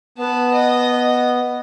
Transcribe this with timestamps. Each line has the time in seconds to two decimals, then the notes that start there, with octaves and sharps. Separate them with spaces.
0.18 B3 B4 A5
0.53 D#5